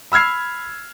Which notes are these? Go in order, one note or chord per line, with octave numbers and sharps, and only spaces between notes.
B5 E6 F6 G#6 C7